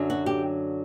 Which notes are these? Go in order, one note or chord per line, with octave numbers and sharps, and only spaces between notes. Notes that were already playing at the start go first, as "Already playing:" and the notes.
Already playing: F#2 D3 F#3
F#4
G4